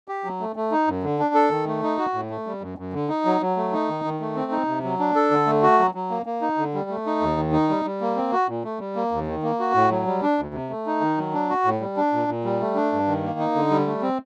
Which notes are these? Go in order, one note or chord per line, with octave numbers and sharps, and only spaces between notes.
G4
F#3
A3
A3
D#4
F#2
D3
D4
A4
D#3
A3
D#4
F#4
A2
A3
G3
F#2
F#2
D3
D#4
F#3
F#3
A3
D#4
D#3
D#3
A3
C4
D#4
C3
F#3
D4
A4
D3
A3
F#4
F#3
F#3
A#3
A#3
D#4
D3
G3
A3
D#4
D#2
D#3
D#4
G3
G3
A#3
C4
F#4
A#2
A3
G3
A#3
D#2
D#3
A#3
F#4
A2
F#3
G3
D4
D2
C3
A3
D#4
D#3
F#3
D4
F#4
A2
G3
D4
A#2
A#2
G3
A3
D4
G2
D#3
A#3
D#4
D3
G3
A3
C4